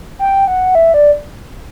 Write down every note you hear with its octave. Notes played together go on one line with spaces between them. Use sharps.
G5
F#5
E5
D5